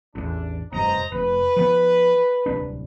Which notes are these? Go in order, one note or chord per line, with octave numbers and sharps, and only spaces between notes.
A1 E2 D4
F1 G2 C5 D#5 A#5
F1 B4
F3 B3
D1 C2 D4